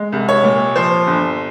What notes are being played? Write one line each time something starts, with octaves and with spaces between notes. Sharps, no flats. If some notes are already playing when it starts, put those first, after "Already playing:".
Already playing: G#3
C2
C#5
A#2
F3 C5
G1